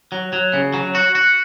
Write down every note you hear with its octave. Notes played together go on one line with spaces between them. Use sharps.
F#3
F#3
C#3
F#3
F#4
F#4